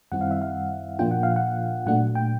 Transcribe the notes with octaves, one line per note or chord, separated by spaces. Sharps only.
F#2 D#3 G3 C4 E4 F#5
F5
E5
F5
A#2 F3 A#3 D4 F4 G5
F#5
F5
F#5
A#2 F#3 A3 D4 F#5
G5